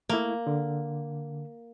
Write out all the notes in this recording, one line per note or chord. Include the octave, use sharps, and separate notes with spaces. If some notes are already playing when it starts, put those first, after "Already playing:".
A3 A#3 E4
D3